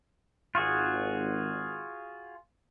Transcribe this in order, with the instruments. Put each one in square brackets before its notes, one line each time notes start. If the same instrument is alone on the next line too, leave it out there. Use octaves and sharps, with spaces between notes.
[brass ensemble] G#1 [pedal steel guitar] F4 F#4 G#4